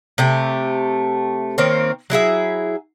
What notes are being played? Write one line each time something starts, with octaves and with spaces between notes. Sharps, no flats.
C3 A3 G4
D#3 A#3 C4 C#5
F#3 E4 G#4 E5